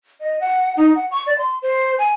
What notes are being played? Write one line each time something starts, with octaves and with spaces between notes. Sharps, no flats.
D#5
F#5
D#4
F#5
C#6
D5
C6
C5
G#5